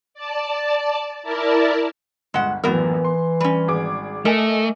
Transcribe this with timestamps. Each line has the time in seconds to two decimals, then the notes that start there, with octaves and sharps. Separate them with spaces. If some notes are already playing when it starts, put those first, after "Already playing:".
0.14 D5 A5
1.23 E4 A#4 D5 A5
2.34 G1 C#2 G#3 F#5
2.64 A#1 F#2 A2 E3 B3 A#4
3.05 C6
3.40 G3 C#4
3.68 G#1 G#4 D6
4.25 A3 A#4 D#5 G#5